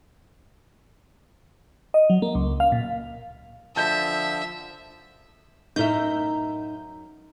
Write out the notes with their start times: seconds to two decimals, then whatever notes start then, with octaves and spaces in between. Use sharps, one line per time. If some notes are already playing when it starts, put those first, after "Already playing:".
1.94 D#5
2.10 F#3
2.22 A#3
2.35 C#2
2.60 F5
2.72 A#2
3.76 D3 F3 E5 A5 G6
5.76 F#2 A2 D#4 A#4 E5 G6